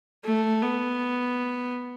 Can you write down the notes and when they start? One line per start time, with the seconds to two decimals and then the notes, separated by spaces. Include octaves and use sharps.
0.25 A3
0.62 B3